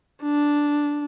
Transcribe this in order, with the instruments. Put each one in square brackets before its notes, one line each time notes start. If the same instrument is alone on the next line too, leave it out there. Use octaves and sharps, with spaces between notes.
[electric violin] D4